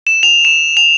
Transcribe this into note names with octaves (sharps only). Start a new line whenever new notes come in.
E7
F7
E7
F7